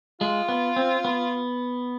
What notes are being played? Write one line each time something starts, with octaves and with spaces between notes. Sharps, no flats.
G#3 F4
B3
C4
B3